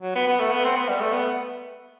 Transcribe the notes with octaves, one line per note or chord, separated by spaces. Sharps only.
F#3
B3
B3
A3
B3
C4
B3
G3
A3
B3